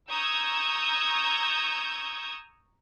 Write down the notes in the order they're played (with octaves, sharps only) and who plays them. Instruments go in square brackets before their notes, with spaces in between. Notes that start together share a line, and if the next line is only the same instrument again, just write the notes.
[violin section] A#5 C#6 D#6 E6 G6 G#6